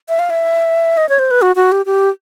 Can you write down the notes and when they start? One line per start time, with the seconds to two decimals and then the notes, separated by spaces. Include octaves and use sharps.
0.09 E5
0.19 F5
0.30 E5
0.97 D#5
1.09 C#5
1.19 C5
1.31 B4
1.42 F#4
1.56 F#4
1.72 G4
1.86 G4